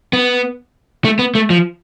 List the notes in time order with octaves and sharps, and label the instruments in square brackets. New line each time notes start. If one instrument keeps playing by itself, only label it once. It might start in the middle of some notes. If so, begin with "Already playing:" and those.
[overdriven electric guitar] B3
A3
B3
A3
F3